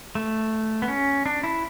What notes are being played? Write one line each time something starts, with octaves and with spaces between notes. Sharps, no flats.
A3
B3
C#4
D4
E4